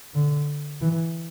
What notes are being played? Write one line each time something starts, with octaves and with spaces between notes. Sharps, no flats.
D3
E3